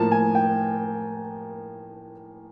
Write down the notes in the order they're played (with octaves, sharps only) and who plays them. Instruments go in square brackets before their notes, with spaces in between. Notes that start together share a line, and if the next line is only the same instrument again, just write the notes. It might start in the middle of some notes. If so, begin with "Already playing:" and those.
Already playing: [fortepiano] A2 F3 A#3 A5
G#5
G5